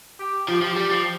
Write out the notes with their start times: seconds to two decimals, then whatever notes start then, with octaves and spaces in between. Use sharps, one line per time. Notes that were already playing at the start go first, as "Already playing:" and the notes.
0.20 G4
0.48 F3 G4
0.62 F3 G4
0.76 G3 G4
0.90 F3 G4